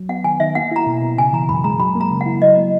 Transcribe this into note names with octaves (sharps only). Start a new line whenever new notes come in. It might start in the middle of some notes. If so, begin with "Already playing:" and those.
Already playing: F#3
B3 F#5
D#3 G#5
D#3 E5
A#3 F#5
E4 A#5
B2
B2
C#3 G#5
E3 A#5
F#2 B5
G#3 A#5
F#3 B5
A#3
A#5
C#3
F#5
E4
F#3 D#5
A#3